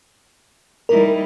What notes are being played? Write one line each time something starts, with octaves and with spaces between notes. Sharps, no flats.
G3 D#4 E4 A#4